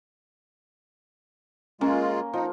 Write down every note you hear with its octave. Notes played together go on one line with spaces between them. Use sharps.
G#3 A#3 C#4 F4
F3 D#4